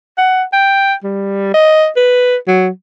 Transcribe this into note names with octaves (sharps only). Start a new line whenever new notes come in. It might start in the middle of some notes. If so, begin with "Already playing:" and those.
F#5
G5
G3
D#5
B4
F#3